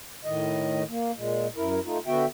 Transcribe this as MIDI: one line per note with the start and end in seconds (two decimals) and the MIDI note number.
0.25 0.83 45
0.25 0.83 51
0.25 0.83 75
0.89 1.12 58
1.17 1.47 46
1.17 1.47 56
1.57 1.80 42
1.57 1.80 64
1.57 1.80 70
1.85 1.98 57
1.85 1.98 63
1.85 1.98 65
2.07 2.26 50
2.07 2.26 59
2.07 2.26 66
2.07 2.26 76
2.07 2.26 79